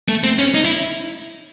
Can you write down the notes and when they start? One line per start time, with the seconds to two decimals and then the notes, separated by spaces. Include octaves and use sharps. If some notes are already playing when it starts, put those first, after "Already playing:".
0.09 A3
0.24 C4
0.39 C#4
0.54 D#4
0.65 E4